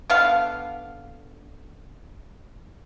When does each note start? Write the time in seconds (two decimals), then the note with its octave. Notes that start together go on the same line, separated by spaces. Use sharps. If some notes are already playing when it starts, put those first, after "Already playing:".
0.10 D3 B3 F5